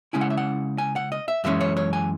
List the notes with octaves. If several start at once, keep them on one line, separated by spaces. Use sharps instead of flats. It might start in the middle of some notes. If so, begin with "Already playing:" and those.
C#3 G#3 C#4 E4 G#5
F#5
E5
F#5
G#5
F#5
D#5
E5
F#2 E3 G#3 C#4 E5
C#5
C#5
G#5